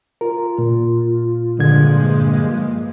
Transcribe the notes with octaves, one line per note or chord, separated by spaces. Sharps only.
F4 A#4
A#2
G2 A#2 D3 F3 G#3 A#3 G#6